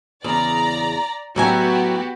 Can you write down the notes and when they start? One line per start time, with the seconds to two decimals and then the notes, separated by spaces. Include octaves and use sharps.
0.24 E2 C#3 D5 A#5
1.36 A2 F#3 B3 F#4 G4 G#5